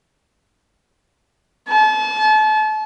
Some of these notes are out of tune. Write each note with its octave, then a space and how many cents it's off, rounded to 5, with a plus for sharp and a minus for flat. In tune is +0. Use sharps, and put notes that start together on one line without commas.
A5 -35